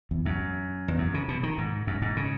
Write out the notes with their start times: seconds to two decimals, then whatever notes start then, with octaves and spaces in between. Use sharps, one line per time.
0.11 E2
0.26 F#2
0.88 E2
0.98 F#2
1.14 C#3
1.28 B2
1.43 D#3
1.58 G#2
1.87 F#2
2.02 G#2
2.17 C#3